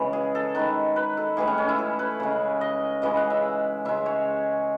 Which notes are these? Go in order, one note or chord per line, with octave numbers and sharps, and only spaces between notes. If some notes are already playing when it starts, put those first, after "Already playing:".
Already playing: C#3 E3 G#3
G#4
A4
D#3 G#3 B4
B4
A4
A2 E3 G#3 G#4
C#4
C#4
E4
A4
B4
C#3 G#3
D#5
C#3 E3 G#3 D#5
F#5
E5
C#3 G#3 E5
C#5